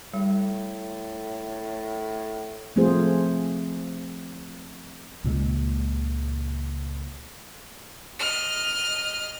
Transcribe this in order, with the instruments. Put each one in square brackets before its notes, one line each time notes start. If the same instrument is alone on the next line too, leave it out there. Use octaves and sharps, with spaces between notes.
[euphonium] A2 [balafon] G3
[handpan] F3 A3 C4 F4 G#4 C5
[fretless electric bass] C#2 A#2 C#3 G#3
[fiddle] D#5 F6